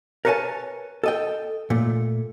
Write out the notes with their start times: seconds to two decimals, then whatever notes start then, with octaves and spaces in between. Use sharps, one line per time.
0.25 A#4 B4 C#5 D5 G#5 A5
1.04 A4 D#5 G5
1.70 A#2 A3